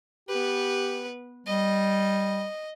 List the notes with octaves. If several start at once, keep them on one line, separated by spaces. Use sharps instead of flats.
B3 G4 B4
G3 D#5